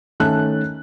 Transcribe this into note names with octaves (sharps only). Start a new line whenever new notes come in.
D#3 A3 C#4 A5 F#6